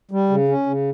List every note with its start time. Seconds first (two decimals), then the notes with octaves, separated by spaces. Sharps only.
0.11 G3
0.29 C#3
0.48 C#4
0.66 C#3